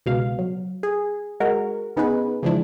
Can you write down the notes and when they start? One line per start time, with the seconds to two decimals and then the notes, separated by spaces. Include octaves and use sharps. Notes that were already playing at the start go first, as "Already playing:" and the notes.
0.06 C#2 B2 F5
0.39 F#3
0.83 G#4
1.40 G#3 F#4 A#4
1.96 C#3 B3 D#4 G#4 B4
2.43 C#3 E3 F3 G#3 D4 E4